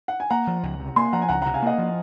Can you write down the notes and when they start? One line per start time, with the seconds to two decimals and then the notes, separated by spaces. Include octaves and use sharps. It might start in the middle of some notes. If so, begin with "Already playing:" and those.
0.08 F#5
0.20 G#5
0.30 A#3 F#5 A#5
0.47 F3
0.63 C#2
0.80 C3
0.96 A#3 G#5 C6
1.13 F3 F#5 A#5
1.22 G#5
1.29 C#2 F#5 A#5
1.42 C3 F#5 A#5
1.54 F5 G#5
1.62 A#3 D#5 F#5
1.78 F3